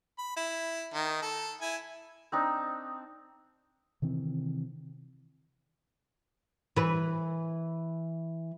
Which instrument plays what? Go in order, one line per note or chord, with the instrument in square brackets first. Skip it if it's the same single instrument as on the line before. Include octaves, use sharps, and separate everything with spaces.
[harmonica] B5
E4
D#3
A4
E4 G#5
[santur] C4 D4 D#4
[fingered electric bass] C3 D#3 E3 C4
[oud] E3 B4